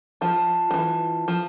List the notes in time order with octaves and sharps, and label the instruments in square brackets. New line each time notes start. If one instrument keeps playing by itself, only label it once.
[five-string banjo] F3 [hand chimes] F4 C5 F5 A5
[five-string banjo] F3
E3
F3